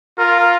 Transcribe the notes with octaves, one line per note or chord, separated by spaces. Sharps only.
F4 A#4
A#4